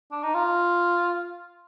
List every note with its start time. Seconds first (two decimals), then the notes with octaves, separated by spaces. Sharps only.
0.12 D4
0.23 D#4
0.35 F4